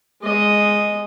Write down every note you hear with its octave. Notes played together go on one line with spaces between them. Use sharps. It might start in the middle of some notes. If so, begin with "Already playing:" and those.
G#3 D#5